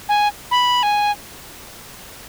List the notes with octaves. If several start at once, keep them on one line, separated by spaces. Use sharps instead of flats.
G#5
B5
G#5